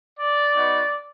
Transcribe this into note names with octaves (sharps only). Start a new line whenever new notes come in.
D5
B3 D#4 F#4